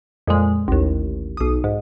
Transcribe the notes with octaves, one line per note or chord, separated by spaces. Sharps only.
F2 A#2 G#3
A1 D#2
B1 D#6
G#2